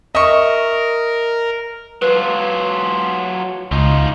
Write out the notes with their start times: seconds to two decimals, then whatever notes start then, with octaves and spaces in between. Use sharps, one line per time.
0.15 A#4 D#5 E5 C#6
2.02 F#3 F4 B4
3.71 C#2 D#4 F4